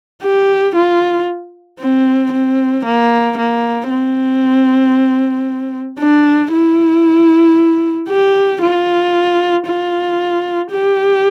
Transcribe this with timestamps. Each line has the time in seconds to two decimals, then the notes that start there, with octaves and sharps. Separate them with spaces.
0.23 G4
0.76 F4
1.80 C4
2.32 C4
2.85 A#3
3.38 A#3
3.90 C4
6.00 D4
6.52 E4
8.09 G4
8.62 F4
9.67 F4
10.71 G4